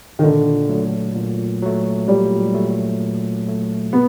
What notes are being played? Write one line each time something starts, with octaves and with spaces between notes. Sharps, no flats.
D#3
A#2 D3
F#3 A3
A#2
F#3 A3
A#2 G3
F#3 A3
A#2
F#3 A3
B2 B3